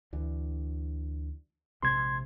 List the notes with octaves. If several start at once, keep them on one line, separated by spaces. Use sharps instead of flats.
D2 D3 E3
A#1 C3 G#3 C6 G#6